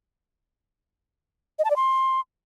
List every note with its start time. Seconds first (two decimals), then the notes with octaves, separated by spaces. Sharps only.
1.59 D#5
1.65 A5
1.70 D5
1.76 C6